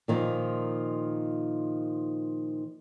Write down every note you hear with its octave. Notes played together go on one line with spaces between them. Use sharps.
A#2 D#3 F3